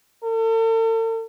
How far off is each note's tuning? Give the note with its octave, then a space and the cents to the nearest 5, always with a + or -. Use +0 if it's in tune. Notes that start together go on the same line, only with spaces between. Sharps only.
A4 +45